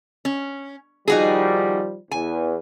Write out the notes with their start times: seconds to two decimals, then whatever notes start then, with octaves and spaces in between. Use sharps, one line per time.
0.25 C#4
1.08 D#3 F3 G3 D#4 F#4 G#4
2.11 E2 G#5